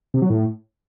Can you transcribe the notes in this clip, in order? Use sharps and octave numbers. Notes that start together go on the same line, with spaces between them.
C3
F#3
A2